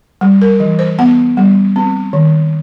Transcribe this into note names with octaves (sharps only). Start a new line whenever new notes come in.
G3
A#4
E3
C5
B3 F#5
G3
C4
D#3